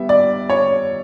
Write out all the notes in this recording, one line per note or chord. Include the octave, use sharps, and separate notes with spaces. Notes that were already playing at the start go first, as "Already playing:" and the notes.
Already playing: G3 B3 E5
D5
C#5